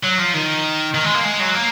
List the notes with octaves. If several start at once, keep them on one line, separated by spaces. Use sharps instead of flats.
F#3
F3
D#3
D#3
G#3
A#3
G#3
F#3
A#3